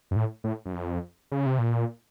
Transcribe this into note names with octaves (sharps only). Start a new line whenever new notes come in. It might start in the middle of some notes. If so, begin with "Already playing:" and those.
F#2
A2
A2
F#2
F2
C#3
C3
A#2